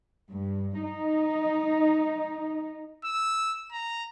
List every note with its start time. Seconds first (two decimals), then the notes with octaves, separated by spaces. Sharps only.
0.30 G2
0.84 D#4
3.05 E6
3.72 A#5